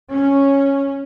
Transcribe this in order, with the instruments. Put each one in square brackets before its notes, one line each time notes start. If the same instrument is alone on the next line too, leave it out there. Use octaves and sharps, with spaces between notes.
[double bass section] C#4